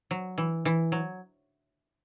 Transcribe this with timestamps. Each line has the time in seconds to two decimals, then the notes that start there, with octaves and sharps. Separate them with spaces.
0.11 F#3
0.38 E3
0.65 E3
0.92 F#3